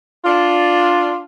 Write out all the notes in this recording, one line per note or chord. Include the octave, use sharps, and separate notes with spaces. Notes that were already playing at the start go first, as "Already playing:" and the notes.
D4 F4